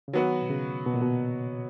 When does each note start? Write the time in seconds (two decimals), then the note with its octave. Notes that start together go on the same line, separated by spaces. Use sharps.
0.08 C#3
0.13 D#3 F#3 B3 F#4
0.42 B2
0.50 C#3
0.86 B2
0.94 A#2
1.02 B2